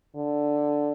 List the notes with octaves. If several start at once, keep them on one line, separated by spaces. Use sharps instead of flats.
D3